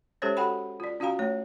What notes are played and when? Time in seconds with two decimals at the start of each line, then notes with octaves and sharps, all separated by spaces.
0.22 G#3 C#4 G4 A4 C5 C#5
0.37 F#4 A4 F#5 G5 B5
0.80 F4 D5
1.00 C#4 F4 F#4 F5 G5 A#5
1.19 A3 C#5